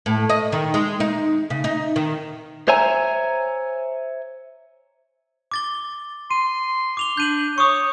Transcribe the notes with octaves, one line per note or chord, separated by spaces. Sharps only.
A2
D#5
D#3
G#3
D#4
C#3
D#4
D#3
C5 C#5 E5 G#5 A#5
D6 A6 G7
C6 D#7
D6 F7 G7
D4 G6 D#7 F#7
C#5 C#6 D#6